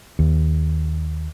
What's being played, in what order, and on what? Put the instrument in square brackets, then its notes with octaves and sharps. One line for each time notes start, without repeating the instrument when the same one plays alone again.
[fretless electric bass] D#2